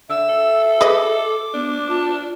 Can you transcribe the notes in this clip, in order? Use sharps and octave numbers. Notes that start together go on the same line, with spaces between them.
D3 E5 E6
A4
G#4 B4 D#5 D6
B3 D4
F4 A5